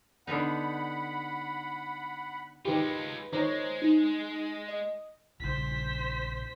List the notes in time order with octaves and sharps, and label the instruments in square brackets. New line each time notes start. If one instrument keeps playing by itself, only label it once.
[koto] D3 B3 D#4 [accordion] F#5 B5
[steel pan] D#3 G4 [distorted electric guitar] G#3 F4 [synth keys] B4 B5
[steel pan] D#3 C#5 [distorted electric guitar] G#3 [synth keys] C5 A#5 A#6
[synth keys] D#4
D#5
[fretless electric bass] A#1 C#3 G3 [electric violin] C5 B6